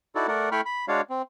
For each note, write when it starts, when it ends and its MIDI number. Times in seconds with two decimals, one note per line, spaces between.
0.15 0.27 63
0.15 0.27 64
0.15 0.27 66
0.15 0.27 69
0.15 0.27 74
0.28 0.49 57
0.28 0.49 70
0.28 0.49 74
0.28 0.49 78
0.52 0.61 57
0.52 0.61 64
0.52 0.61 79
0.52 0.61 83
0.52 0.61 85
0.52 0.61 89
0.66 0.85 83
0.88 1.01 56
0.88 1.01 62
0.88 1.01 66
0.88 1.01 73
0.88 1.01 74
0.88 1.01 77
1.10 1.22 60